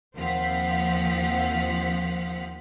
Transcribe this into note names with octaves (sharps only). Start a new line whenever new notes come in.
D#2 F3 C4 F5 F#5 B6